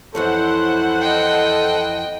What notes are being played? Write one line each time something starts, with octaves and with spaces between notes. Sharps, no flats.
F2 E3 E4 A4 C5 C#5 F#5
D#5 G5